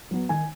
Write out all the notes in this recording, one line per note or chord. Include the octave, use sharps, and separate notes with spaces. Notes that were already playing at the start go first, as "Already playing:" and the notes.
F#3 B3
D#3 G#5